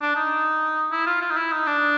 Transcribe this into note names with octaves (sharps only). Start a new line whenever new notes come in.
D4
D#4
E4
F4
F4
D#4
E4
D#4
D4